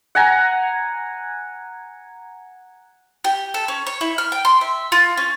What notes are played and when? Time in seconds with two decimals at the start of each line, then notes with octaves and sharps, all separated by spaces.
0.15 F#5 G#5 A#5
3.24 G4
3.54 A4
3.68 C#4
3.87 C#5
4.01 E4
4.18 F6
4.32 G5
4.45 C6
4.61 E5
4.92 F4
5.17 C#4